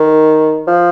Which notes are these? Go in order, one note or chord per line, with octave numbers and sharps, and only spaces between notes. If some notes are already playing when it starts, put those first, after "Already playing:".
Already playing: D#3
F3